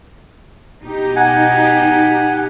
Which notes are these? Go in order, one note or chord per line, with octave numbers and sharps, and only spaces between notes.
B2 D#4 G4
F#5 G#5